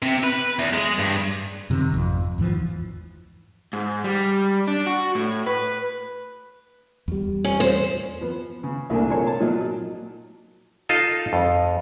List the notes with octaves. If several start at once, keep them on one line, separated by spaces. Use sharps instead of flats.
C3
B4
E2
G#3
G2
F#2 C3 D#3
G#1 F2
E2 G#2 E3 F3
G#2
G3
D4
F#4
A2
B4
E2 G3
C#4
C5
F3 B3
C#3
C2 A#2 A3 A#3 D4 G#5
F3 C4 G#4 A4 C#5
A5
A#2 F3 F#3 D#4
D#4 F4 A4 D#5
F2